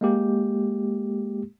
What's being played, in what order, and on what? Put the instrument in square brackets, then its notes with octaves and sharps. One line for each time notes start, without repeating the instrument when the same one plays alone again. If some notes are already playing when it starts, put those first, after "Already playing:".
[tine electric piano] G#3 A#3 G4